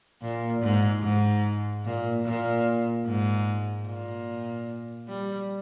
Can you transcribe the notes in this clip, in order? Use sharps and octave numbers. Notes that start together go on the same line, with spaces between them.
A#2
G#2
G#2
A#2
A#2
G#2
A#2
G3